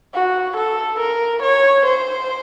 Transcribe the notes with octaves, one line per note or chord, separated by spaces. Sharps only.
F#4
A4
A#4
C#5
C5